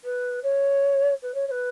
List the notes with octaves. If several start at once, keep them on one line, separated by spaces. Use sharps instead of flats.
B4
C#5
B4
C#5
C#5
B4